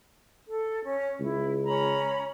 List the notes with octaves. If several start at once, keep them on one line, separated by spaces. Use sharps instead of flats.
A4
C#4
C#2 E4
C#4 A#5 B5